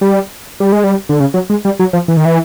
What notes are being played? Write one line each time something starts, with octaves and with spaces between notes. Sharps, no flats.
G3
G3
G#3
G3
D3
C#3
F#3
G#3
G3
F#3
F3
E3
D#3
E3